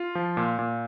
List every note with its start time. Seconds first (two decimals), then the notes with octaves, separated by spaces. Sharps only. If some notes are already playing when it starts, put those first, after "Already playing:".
Already playing: F4
0.15 F3
0.37 A#2
0.59 A#2